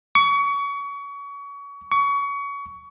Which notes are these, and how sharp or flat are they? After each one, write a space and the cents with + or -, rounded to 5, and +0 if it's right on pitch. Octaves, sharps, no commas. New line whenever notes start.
C#6 +30
C#6 +25